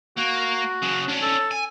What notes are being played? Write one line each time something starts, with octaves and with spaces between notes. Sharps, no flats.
A#3 F#4
C#3 F#3
C#4 D4
A4
G#5